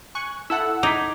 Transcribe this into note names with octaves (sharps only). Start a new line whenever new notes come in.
G#5 C#6 F#6
E4 A4 F#5 E6
D#4 D6 G#6 B6